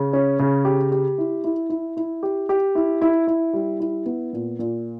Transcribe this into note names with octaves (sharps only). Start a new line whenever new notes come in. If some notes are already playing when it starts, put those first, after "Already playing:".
Already playing: C#3
C#4
C#3
G4
G4
E4
E4
E4
E4
G4
G4
E4
E4
E4
G3
E4
B3
A#2
A#2